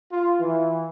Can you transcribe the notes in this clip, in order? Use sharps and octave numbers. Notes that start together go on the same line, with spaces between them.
F4
E3